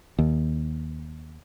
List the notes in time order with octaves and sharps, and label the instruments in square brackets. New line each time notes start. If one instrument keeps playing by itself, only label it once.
[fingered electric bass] D#2